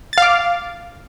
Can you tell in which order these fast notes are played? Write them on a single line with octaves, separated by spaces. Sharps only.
A6 F5 D6